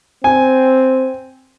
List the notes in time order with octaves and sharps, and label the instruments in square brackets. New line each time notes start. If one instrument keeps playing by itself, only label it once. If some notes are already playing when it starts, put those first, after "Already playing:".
[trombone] C4 [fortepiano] G#5